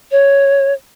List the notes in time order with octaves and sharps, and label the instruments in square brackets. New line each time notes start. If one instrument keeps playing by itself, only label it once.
[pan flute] C#5